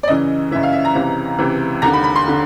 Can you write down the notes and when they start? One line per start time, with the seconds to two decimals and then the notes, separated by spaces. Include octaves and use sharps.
0.03 D5
0.08 F#2 C#3 E3 D#5
0.51 F#2 C#3 E3 E5
0.63 F5
0.73 E5
0.85 A#5
0.95 C#2 C3 E3
1.39 C#2 C3 E3
1.82 D#2 D3 A#5
1.93 B5
2.04 B5
2.16 C6
2.28 D3